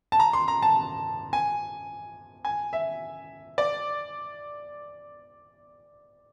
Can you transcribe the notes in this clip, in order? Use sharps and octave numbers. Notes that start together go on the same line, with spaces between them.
A5
A#5
C6
A#5
A5
G#5
G#5
E5
D5